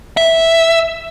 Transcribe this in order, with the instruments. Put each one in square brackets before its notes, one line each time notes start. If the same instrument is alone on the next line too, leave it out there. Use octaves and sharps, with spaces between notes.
[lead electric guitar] E5